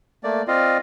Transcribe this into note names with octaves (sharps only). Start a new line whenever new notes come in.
A3 A#3 D5
C4 F4 D5 D#5 F5